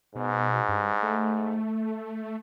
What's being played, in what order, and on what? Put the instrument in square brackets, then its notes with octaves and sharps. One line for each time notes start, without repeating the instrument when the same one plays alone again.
[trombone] G#2 [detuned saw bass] B2
[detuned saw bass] G2
A3